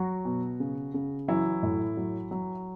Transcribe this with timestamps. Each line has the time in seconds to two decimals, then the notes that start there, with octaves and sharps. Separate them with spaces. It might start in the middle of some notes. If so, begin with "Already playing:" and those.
Already playing: F#3 F#4
0.25 B2
0.60 C#3
0.94 C#3
1.28 E3 F#3 E4
1.63 A2
1.97 F#3
2.31 F#3